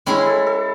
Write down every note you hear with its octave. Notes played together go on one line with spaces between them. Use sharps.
G#3 C#4 E4 G#4 B4
A4
A4